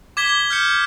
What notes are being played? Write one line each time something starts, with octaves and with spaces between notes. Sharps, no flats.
D6 G#6 B6 G7
F6 G6 C#7